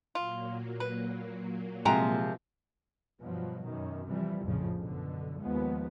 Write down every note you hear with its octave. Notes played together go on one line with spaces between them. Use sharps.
A#2 F#3 A#3 F4
B4
C3 F3 G#3 F#4 G5 A#5
G2 B2 F3 F#3
F#2 B2 D#3
C3 E3 F3 G3
A#1 F2 A2 C#3 F3
F#2 B2 D3
D#2 F3 G#3 B3